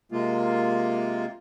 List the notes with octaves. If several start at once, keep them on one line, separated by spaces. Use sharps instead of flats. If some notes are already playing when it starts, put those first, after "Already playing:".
C3 G#3 A#3 F4